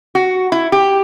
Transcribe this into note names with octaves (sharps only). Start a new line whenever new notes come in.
F#4
E4
G4